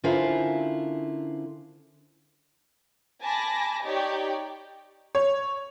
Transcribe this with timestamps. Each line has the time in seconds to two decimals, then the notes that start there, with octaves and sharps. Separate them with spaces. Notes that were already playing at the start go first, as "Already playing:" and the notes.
0.04 D3 C#4 E4 F4 A#4 C5
3.22 G#5 A5 B5 D6 A#6
3.84 D#4 G4 C#5 D5 G5
5.15 C#5